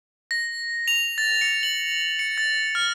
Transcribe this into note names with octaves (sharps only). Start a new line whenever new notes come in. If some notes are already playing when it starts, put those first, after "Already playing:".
A#6
F7
A6
C#7
F#7
C#7
A6
F6